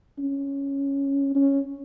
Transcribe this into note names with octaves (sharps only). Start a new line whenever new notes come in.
C#4
C#4